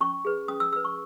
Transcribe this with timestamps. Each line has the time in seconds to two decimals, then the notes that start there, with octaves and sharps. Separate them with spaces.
0.01 C#4 C#6
0.25 G#4 B4
0.48 C#4 D#6
0.60 E6
0.72 G#4 B4 E6
0.85 C#6